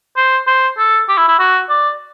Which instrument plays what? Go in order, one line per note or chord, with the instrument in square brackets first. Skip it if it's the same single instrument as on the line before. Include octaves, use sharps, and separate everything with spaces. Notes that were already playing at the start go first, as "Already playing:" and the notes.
[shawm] C5
C5
A4
G4
E4
E4
F#4
D5